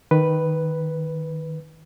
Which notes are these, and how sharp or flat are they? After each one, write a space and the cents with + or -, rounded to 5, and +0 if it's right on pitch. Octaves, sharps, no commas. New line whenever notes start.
D#3 +0 B4 +0